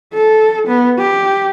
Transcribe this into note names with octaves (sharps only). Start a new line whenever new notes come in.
A4
B3
G4